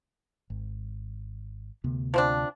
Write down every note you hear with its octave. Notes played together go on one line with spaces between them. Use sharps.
G#1
D2 C3 B3
F3 C4 D4